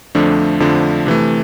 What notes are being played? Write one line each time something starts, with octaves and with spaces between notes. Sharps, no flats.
F2 D3 F3 A3 D4
F2 D3 F3 A3 D4
C3 E3 A3